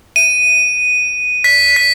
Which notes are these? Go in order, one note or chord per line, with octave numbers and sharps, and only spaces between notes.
D#7
B6
B6